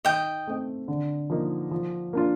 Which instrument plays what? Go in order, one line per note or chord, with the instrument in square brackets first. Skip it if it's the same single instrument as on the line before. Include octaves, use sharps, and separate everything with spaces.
[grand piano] D#3 [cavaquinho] D#5 G5
[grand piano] A3 C4
D3
F3 A#3 D#4
F3
A#3 D4 F4